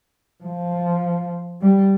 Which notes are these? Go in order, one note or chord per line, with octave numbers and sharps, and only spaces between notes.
F3
G3